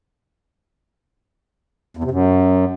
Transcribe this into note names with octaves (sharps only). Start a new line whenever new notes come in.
E2
C3
F#2